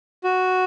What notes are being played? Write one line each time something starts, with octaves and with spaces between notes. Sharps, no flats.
F#4